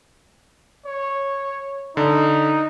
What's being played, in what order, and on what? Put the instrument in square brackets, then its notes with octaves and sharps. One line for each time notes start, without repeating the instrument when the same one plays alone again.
[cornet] C#5
[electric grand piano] D3 [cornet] D#4